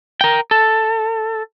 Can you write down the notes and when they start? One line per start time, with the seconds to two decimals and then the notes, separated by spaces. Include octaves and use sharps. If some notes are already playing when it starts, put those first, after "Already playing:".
0.21 A#4 G5
0.51 A4